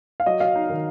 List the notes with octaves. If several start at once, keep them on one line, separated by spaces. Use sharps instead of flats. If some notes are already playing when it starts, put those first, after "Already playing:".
F5
F#3 D#5
F#3 F5
D#4
D#3